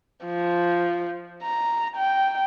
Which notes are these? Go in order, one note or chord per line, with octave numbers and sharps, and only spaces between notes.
F3
A#5
G5